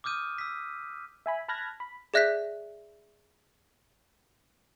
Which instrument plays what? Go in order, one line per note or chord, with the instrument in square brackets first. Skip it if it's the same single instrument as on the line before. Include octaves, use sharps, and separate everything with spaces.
[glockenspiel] D6 D#6 F6 G6 D#7
E6 B6
[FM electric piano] E5 G#5 B5
A5 B5 F6 F#6 G#6 A#6
B5
[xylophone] G#4 D5 E5 F#6 G6 B6